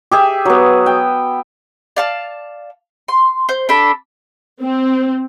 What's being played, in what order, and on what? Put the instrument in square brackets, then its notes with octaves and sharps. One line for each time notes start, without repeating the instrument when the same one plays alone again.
[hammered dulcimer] G4 G#4 E5
F#3 B3
G5
[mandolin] D5 F5 A5
C6
C5
D4 A4 B5
[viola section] C4